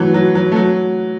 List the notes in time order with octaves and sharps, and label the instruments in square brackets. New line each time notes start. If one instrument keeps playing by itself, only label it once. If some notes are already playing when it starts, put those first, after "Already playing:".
Already playing: [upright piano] E3 F#3 A3
F#3
F#3
A3
F#3